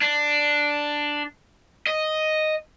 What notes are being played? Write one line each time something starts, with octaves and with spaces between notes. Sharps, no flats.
D4
D#5